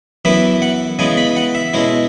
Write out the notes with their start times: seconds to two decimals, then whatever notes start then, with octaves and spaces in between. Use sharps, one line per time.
0.25 F#2 E3 B3 E4 E5
0.62 F#5
0.99 C#3 E3 G#3 B3 G#5
1.17 B5
1.37 F#5
1.55 E5
1.73 B2 G#3 C#4 E4